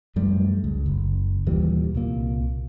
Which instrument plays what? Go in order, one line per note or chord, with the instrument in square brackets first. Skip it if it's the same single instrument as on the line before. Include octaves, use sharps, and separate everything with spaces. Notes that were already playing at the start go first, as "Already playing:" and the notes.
[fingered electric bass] F#2 F3 G3 A3
C#2
F#1
D#2 A#2 E3 G3
C2 A#2 A#3